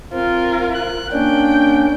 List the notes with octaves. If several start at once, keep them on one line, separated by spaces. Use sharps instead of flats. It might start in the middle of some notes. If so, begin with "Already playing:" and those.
C4 F4 A#4
F#6
A#3 C#4 D4 G5